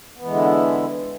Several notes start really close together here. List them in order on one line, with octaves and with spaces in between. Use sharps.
B3 E3 G#3 D3 E4